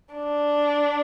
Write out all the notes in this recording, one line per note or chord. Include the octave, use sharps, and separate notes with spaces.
D4